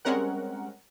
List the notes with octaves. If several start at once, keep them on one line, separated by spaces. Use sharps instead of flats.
G3 G#3 C4 C#4 A#4 F#5